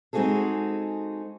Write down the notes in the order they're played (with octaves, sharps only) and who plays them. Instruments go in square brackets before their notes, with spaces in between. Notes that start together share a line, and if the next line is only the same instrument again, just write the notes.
[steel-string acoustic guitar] G#3 C4 D#4 F#4 G#4 A4